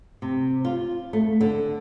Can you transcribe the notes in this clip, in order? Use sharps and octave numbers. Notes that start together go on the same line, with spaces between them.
C3
F4
A3
D3